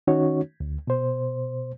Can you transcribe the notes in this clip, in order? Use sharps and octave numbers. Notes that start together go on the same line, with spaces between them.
D#3 C#4 D#4 F#4 C#5
D2
B2 C5